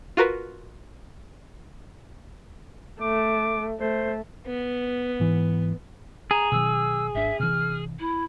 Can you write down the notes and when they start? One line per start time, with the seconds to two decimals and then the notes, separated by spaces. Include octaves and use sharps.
0.17 F4 F#4 A#4 B4
3.01 A3 D6
3.80 A3 C5
4.46 B3
5.20 G#2 E3
6.31 G#4 A#5
6.52 B2 D#3 F#3 E6
7.14 G#1 D4 E5
7.40 C3 E3 F6
7.99 E4